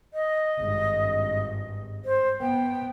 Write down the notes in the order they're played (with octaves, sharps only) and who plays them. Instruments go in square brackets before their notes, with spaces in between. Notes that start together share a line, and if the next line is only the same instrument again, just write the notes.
[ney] D#5
[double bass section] G#1 G2
[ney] C5
[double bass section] B3 [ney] G5